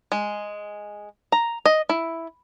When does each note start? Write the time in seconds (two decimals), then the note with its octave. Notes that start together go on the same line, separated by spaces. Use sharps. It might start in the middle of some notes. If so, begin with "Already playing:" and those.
0.12 G#3
1.32 A#5
1.66 D#5
1.89 E4